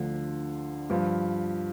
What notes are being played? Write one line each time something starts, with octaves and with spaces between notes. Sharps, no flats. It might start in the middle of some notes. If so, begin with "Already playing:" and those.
Already playing: D2 D3 F3
G2 F3